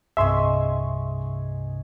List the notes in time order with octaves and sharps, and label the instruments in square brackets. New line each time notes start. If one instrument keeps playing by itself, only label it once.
[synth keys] C2 G2 C3 [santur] G#4 D#5 C#6 [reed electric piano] E5 C6